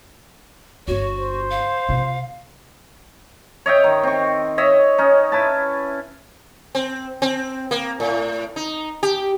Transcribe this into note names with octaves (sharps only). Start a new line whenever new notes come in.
G1 B3 F#4 C#5
C5
F5
C3 F4
C#5 D#5 E5 G5
D#3
C4 C#6
C#5 D#5 E5
C#4 D#4
E4 B4 A5
C4
C4
A#3
A2
D#4
G4